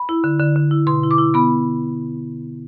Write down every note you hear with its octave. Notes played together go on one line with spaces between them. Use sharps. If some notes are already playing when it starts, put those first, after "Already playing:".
Already playing: B5
E4
D3
D3
D3
E4
B2 C6
E4
D6
E4
B3 B5